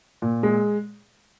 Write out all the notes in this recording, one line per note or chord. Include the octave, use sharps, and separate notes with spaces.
A#2
G#3